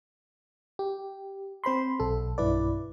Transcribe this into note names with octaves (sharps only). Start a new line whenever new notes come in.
G4
C4 C5 B5 C6
B1 A4
B1 G2 E4 B4 D5